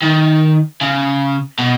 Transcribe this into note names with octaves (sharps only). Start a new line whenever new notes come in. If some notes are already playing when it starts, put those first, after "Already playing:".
D#3
C#3
B2